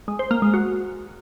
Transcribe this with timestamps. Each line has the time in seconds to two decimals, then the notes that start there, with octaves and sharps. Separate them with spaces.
0.08 G#3
0.19 C5
0.31 A#3
0.42 G#3
0.54 F#4